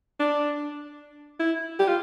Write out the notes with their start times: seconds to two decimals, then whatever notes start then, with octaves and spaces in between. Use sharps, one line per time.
0.20 D4
1.40 E4
1.80 G4
1.88 F4